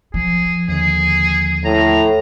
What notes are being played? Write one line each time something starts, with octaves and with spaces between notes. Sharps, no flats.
F3 G#4
D#2 D3 G#4
A2 A#5